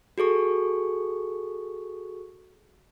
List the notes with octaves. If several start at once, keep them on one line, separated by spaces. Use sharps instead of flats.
F#4 G#4 A4 C#6